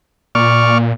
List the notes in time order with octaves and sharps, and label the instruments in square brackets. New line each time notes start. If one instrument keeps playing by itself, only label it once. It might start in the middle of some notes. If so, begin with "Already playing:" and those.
[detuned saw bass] A#2 [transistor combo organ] D5 C#6 F6